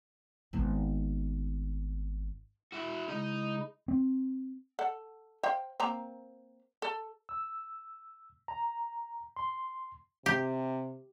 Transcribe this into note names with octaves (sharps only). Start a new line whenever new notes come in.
G#1 B3
E4 F#4
C#3 G#3 D#4 E4 D#5
C4
A4 F#5
C5 F5 G5
A#3 C4 A#5
A4
E6
A#5
C6
C3 G4